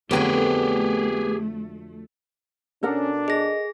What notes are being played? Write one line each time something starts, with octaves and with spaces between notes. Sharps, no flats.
F2 D3 F#3 A3 B3 G4 G#4 G5
B2 C#4 D4 A4 A#4 F#5
G#4 D#5 A#6